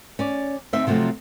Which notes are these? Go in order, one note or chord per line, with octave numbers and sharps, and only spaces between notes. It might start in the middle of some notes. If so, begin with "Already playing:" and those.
C#4 D5
D2 C4 D#4 E5
C3 F3 F#3 A3 C4